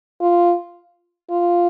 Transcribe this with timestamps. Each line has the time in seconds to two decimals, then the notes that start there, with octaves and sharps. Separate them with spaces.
0.22 F4
1.31 F4